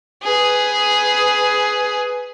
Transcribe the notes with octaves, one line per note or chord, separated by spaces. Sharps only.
G#4 B4